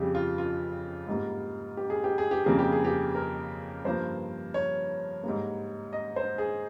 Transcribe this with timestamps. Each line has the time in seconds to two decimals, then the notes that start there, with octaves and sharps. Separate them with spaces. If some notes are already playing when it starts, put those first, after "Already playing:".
Already playing: F2 C#3 G3 G4 G#4
0.15 F4
0.38 F4
1.07 G#2 G3 A#3
1.77 G4
1.90 G#4
2.04 G4
2.18 G#4
2.31 G4
2.45 F2 C#3 G3 A#3 G#4
2.59 G4
2.72 G#4
2.85 G4
3.15 A#4
3.85 G2 F3 A#3 C5
4.54 C#5
5.23 G#2 G3 A#3
5.93 D#5
6.16 C5
6.38 G#4